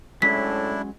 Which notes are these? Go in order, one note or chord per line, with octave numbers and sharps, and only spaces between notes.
A2 F#3 G#3 C#4 D4 E4 B6